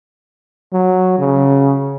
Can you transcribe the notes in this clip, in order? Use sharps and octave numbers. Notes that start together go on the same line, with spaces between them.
F#3
C#3